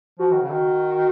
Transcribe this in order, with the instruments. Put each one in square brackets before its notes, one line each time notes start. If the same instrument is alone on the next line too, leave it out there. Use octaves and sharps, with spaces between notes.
[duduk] F3 [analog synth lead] F#4
[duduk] D#3
C#3
D#3